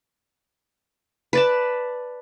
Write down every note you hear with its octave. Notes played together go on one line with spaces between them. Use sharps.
B4 D5 A5